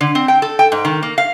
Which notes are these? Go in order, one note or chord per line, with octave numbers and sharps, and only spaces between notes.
D3
C4
G5
A4
G5
G#2
D#3
A#3
F5